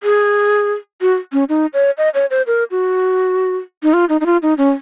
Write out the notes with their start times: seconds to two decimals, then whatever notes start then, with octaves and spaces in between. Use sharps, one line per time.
0.03 G#4
1.01 F#4
1.33 C#4
1.49 D#4
1.74 C#5
1.98 D#5
2.14 C#5
2.31 C5
2.47 A#4
2.71 F#4
3.83 D#4
3.93 F4
4.09 D#4
4.21 D#4
4.26 F4
4.42 D#4
4.58 C#4